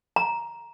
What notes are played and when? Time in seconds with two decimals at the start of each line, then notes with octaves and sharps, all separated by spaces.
0.16 A#5